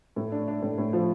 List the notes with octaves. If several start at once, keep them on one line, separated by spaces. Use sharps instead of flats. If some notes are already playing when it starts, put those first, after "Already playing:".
A2
D4
D4
A2
A2
F3